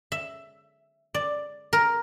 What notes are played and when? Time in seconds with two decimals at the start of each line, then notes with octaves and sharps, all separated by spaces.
0.12 E5
1.14 D5
1.73 A#4